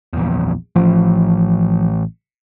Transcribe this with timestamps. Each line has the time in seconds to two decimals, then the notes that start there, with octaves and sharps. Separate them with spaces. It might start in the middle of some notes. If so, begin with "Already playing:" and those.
0.13 A#1 E2
0.76 A1 F3